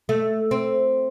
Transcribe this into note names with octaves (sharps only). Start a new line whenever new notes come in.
A3
C4